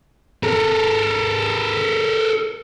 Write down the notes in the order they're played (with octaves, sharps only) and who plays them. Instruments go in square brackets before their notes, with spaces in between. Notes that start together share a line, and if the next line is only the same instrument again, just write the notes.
[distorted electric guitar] A4 A#4